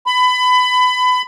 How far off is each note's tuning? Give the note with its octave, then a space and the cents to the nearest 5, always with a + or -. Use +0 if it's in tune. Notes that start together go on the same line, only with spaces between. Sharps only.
B5 +25